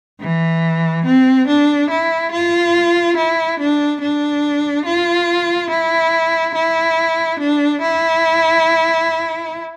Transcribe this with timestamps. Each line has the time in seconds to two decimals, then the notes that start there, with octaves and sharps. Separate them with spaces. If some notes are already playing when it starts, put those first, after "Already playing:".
0.20 E3
1.05 C4
1.48 D4
1.90 E4
2.32 F4
3.16 E4
3.59 D4
4.01 D4
4.85 F4
5.70 E4
6.55 E4
7.39 D4
7.82 E4